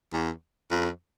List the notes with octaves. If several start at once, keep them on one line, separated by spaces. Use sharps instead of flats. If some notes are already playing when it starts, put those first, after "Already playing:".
E2
F2